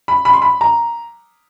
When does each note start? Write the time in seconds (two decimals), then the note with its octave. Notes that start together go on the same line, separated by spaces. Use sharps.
0.08 B5
0.25 B5
0.33 C6
0.42 B5
0.61 A#5